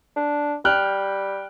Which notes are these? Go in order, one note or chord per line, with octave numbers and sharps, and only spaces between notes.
D4
G3 G5 F6 F#6